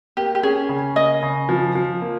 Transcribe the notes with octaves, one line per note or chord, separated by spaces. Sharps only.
A#3 G4
G4
C#4 G#4
C#3
A#3 D#5
C#3
F3
F3
A#3